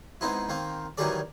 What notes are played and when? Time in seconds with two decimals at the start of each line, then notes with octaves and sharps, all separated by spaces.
0.21 G#2 B3 C4 D#4 E4
0.49 D#3 A#3 C4
0.98 D#3 E3 F#3 G3 G#4 D5